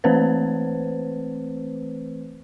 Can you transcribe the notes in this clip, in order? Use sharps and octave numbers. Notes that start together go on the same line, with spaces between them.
E3 A3 C4 B4 C5